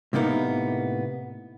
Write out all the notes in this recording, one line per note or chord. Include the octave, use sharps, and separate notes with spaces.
A2 C3 A#3 B3 D#4